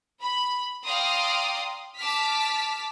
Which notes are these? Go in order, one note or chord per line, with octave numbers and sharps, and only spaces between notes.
B5
D5 F5 G5 A#5 C6 D#6
A5 D6 F6 B6